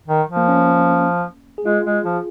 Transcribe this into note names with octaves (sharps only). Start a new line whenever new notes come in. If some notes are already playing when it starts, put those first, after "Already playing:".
D#3
F3
A#3
C#4
G#4
G#3 F4
G#3
F3